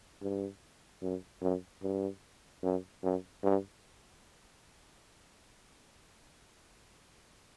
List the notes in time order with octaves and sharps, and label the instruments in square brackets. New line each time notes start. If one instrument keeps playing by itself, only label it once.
[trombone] G2
F#2
F#2
G2
F#2
F#2
G2